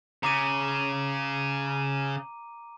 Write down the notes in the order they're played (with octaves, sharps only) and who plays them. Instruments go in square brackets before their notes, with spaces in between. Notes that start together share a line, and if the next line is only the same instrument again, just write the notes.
[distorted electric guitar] C#3 [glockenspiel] A#5 D6 D#7